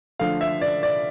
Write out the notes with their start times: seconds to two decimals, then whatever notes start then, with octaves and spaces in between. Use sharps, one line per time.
0.19 D3 F3 A3 F5
0.41 E5
0.62 D5
0.83 D5